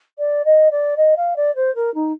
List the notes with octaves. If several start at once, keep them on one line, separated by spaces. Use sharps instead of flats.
D5
D#5
D5
D#5
F5
D5
C5
A#4
D#4